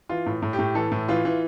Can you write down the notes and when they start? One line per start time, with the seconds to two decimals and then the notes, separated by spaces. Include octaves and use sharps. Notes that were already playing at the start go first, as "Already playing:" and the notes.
0.09 E3 F4
0.26 A2
0.42 A2
0.53 G4
0.59 A2
0.75 E3 A4
0.92 A2
1.08 E3 F4
1.25 E3